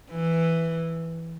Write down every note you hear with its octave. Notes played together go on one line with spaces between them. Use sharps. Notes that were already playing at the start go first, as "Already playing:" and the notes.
E3